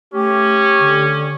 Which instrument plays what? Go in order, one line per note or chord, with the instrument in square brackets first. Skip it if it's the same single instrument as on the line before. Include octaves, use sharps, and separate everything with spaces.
[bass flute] A3 [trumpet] C#4 [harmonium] G4
[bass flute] D3